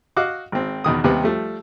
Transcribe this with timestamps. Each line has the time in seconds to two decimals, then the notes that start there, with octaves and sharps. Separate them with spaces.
0.17 F#4 D#5 F5 F#5 D6
0.52 G#1 C4
0.84 E2 B2 D#3 D#6
1.04 D#2 C3 G3 B3 B4
1.24 F3 G3 A3